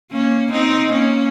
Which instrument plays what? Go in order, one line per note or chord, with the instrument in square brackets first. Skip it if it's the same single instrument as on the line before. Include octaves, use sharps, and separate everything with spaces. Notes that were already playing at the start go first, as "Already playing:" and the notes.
[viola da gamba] A#3 C#4
C4 D#4
A#3 C#4